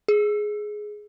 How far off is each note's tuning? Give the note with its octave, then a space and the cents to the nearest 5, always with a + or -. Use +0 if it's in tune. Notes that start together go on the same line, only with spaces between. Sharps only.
G#4 +10